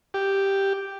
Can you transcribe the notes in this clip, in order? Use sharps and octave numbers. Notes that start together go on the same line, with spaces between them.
G4